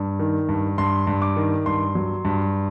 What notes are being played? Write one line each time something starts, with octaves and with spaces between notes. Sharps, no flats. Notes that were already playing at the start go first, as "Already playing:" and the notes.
Already playing: G2
D#3
G2
G2 C6
G2
D6
D#3
G2 C6
F#3
G2